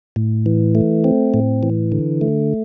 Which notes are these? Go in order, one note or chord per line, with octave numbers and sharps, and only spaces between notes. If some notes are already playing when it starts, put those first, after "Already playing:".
A2
E3
A3
C4
A2
E3
D3
A3